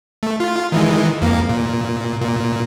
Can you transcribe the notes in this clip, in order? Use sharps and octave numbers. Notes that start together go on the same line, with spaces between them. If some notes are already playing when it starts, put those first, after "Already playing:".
A3
F4
D#3 E3 G#3
F2 A#3
A#2
A#2